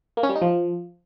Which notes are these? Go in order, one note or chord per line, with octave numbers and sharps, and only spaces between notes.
A#3
C#4
G3
D#4
F3